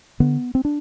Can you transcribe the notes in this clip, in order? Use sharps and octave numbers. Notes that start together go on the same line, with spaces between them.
D3 B3
C4
D4